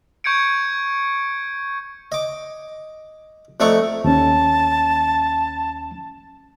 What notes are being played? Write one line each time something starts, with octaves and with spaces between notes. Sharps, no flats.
C#6 G6 G#6 C#7 D7
D#5 D6
F2 A3 D5 D#5 A#5 C#6
D#2 C#4 A5